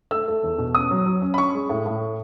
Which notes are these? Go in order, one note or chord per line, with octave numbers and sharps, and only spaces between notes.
A3 E6
A3
E2
B2
C#4 D#6
F#3
F#3
C#4
B5
C#4 C#6
G#3
A2
A2